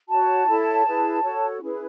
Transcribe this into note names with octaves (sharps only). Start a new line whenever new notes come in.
F#4 C#5 A5
E4 A4 C#5
E4 G#4 B4
F#4 A4 C#5
C#4 E4 G#4 B4